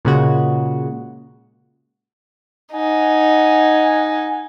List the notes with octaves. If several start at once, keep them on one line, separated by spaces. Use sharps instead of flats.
A#2 C#3 G#3 F#4
D#4 F#5 G#5